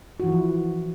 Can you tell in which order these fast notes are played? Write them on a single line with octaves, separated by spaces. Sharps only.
F#4 E3 E4 F3